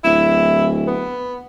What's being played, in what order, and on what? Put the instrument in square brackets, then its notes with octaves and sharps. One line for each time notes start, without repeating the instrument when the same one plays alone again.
[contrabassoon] D1 [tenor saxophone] E4
[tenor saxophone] B3